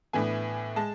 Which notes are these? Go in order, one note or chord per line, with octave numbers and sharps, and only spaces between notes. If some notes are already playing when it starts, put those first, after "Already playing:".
A2 E3 B3 D4 G#5
G#3 A5